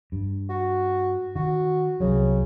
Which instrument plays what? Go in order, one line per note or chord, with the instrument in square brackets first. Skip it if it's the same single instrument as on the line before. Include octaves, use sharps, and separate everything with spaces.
[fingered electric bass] G2
[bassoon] F#4
[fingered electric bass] D#3 [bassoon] F#4
[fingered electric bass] C2 F#3 [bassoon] C#3